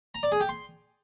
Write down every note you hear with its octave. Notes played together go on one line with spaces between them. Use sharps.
A#5
D5
G#4
G4
C6